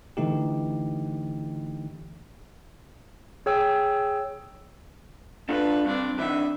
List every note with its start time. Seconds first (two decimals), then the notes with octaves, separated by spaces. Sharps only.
0.17 D3 E3 A3 D#4 G4
3.46 G#4 C#5 G5 E6
5.49 D4 F4 A4 B4
5.85 G2 C4 D4
6.19 E3 D4 D#4 E5